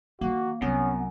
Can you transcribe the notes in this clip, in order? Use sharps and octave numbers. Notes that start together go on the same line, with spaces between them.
D#3 F3 A#3 F#4
C2 F#2 B3 C#4